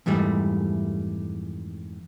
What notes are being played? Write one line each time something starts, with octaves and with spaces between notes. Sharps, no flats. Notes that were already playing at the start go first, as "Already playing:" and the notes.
F2 G#2 E3 G3 A3